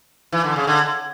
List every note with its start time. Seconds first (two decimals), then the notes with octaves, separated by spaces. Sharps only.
0.32 E3
0.44 D3
0.56 C#3
0.67 D3